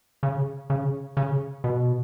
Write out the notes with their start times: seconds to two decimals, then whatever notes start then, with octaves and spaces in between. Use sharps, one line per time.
0.23 C#3
0.70 C#3
1.17 C#3
1.64 B2